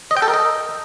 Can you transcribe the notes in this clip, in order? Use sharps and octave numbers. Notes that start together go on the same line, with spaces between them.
D#5
G5
A4
A#4
D#5